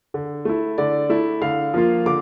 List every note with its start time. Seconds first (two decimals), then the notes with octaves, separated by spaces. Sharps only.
0.14 D3
0.45 A3 E4
0.78 D3 D5
1.09 A3 E4
1.41 D3 F5
1.74 F3 A#3 F4
2.06 D3 D6